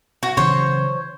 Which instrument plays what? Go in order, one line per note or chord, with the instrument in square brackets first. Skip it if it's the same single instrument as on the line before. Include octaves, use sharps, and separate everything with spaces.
[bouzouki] F#4
[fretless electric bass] C#3 E3 F#3 [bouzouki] C5 C#5